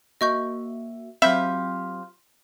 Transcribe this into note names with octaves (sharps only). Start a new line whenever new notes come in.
A#3 F#4 D#5 E5 C#6 G6
F#3 C4 F4 G4 E5 B5 G6